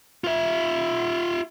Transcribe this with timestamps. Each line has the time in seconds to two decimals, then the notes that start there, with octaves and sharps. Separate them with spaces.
0.24 F4 E5